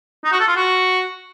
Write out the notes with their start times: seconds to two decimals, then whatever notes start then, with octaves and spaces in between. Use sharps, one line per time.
0.24 D#4
0.32 F#4
0.40 A4
0.48 F4
0.56 F#4